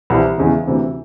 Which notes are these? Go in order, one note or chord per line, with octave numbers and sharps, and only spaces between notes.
C2 C3 E3
E2 C#3 E3 G#3
D2 C3 E3